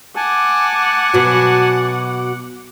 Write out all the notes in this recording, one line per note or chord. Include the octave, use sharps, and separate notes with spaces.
F#5 G#5 A5 D6
B2 F#3